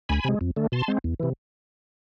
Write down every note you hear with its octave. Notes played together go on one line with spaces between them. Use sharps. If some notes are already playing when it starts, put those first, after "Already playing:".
D2 G#5 B5
C3 G#3
F2
D3 A3
B2 A5 C6
G#3 C4
E2
C3 E3